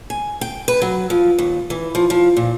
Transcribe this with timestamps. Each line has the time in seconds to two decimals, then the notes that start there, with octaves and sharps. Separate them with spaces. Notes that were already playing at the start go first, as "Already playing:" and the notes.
0.10 G#5
0.41 G5
0.68 B4
0.82 F#3
1.10 F3
1.39 D#2
1.70 E3
1.95 F3
2.10 F3
2.37 A#2